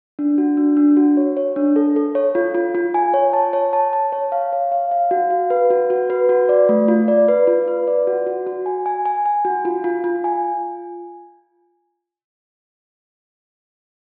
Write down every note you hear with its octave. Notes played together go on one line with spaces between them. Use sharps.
D4
F#4
D4
D4
F#4
C#5
C#5
D4
A4
A4
C#5
F4
F4
F4
G#5
C#5
A5
C#5
A5
A5
C#5
F5
C#5
F5
F5
F#4
F5
B4
F#4
F#4
B4
F#4
D5
A3
F4
D5
B4
F4
B4
D5
F#4
F#4
F#4
G#5
G#5
G#5
G#5
F#4
F4
F4
F4
G#5